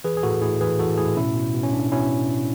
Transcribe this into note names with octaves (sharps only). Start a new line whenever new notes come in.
E3 G#4 B4
G#4
A2 F#4 A4
A2 E4 G#4
E3 G#4 B4
E3 F#4 A4
A2 E4 G#4
B2 C#4 E4
B2
B2
C#4
B2 D4
B2 C#4 E4